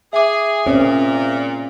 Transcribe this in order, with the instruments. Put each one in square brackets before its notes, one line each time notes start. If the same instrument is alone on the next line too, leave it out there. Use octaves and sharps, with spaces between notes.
[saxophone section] G#4 [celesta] E5 D6
[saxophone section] A#2 [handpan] C4 C#4 G#4